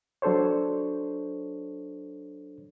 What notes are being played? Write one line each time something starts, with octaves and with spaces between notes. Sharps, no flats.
F#3 D4 A4 C5 C#5